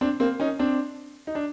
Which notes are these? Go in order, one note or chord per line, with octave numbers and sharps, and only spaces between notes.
C4 D4
A#3 C4
C#4 D#4
C4 D4
D#4
D4